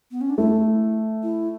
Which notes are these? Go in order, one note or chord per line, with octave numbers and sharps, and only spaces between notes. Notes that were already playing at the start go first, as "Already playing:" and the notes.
B3
C#4
D4
A3 E4
E4